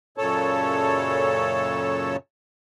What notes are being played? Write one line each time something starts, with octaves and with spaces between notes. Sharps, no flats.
F#2 A#2 C#3 A4 C#5 A5